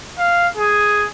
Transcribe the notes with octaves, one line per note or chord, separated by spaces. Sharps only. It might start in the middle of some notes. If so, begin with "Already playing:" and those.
F5
G#4